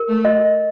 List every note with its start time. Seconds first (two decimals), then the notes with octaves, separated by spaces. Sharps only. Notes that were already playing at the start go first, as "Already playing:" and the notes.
Already playing: A#4
0.09 A3
0.25 D#5